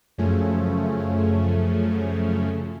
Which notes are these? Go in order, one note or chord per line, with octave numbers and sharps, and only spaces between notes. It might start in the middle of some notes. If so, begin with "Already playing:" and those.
F#2 C#3 F3 A3 C#4